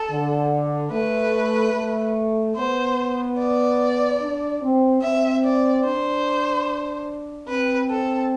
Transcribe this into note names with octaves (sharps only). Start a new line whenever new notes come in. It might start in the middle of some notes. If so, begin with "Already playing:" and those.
Already playing: A4
D3
A3 B4
A3
B3 C5
D5
D4
C4
C4 E5
D5
D4 C5
C4 B4
A4